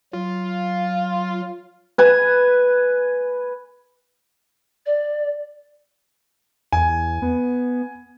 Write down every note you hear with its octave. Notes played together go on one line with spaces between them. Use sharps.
F#3 F4
B4 G#5
D5
E2 G#5
B3